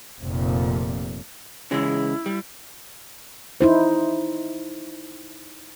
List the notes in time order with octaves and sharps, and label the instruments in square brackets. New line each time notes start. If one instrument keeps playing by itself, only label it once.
[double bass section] F1 F2 A#2
[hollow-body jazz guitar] C#3 E3 G#3 [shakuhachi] E4
[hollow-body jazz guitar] G3
[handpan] D#4 E4 C5